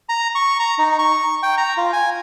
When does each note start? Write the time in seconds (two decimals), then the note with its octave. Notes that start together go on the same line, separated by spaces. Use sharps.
0.09 A#5
0.35 C#6
0.60 A#5
0.78 D#4
0.99 C#6
1.43 G5
1.58 A#5
1.77 F4
1.93 G#5